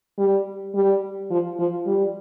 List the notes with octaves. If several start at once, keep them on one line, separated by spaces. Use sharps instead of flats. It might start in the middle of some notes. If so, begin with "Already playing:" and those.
G3
G3
F3
F3
G3